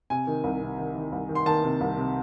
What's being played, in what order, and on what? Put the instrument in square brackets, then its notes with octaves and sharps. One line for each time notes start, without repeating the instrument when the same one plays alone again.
[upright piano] C3 G#5
D#3
C2
C3
D#3
D#3
C2
D#3
C6
D#3 A5
C3
C2
C3